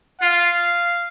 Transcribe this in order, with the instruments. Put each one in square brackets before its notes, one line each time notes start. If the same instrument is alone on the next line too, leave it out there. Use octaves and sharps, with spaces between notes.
[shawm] F4 [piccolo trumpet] F5